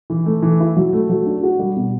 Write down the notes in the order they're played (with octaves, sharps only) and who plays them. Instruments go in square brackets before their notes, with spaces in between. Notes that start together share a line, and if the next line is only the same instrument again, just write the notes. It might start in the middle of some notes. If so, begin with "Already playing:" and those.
[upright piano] E3
A3
E3
E4
F#3
A3
F#3
D4
F#4
G3
B2